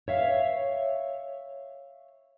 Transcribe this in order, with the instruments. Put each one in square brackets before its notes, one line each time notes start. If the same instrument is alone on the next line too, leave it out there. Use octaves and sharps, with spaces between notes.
[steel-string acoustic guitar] C#5 E5 F5